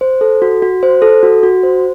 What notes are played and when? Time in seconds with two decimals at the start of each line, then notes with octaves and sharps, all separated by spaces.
0.01 C5
0.21 A4
0.42 F#4
0.62 F#4
0.83 C5
1.02 A4
1.23 F#4
1.43 F#4
1.63 C5